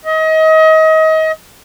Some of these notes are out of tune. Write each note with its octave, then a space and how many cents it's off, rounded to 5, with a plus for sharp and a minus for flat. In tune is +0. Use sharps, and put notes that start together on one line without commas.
D#5 +30